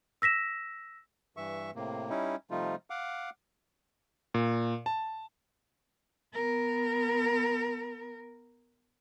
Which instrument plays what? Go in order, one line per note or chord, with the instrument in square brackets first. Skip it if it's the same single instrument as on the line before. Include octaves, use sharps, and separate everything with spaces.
[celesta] E6 A#6 B6 E7
[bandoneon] G2 E3 E5 C#6
A2 C3 A#3
G3 C#4 D#4 E4
C3 F3 G3 A3 D#4 F4
F5 F#5 D6
[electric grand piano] A#2
A5
[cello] B3 A#4